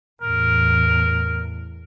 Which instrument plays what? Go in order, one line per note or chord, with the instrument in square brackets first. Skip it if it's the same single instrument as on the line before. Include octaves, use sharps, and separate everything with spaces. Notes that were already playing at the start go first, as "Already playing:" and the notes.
[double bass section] E2 A2 [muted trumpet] A#4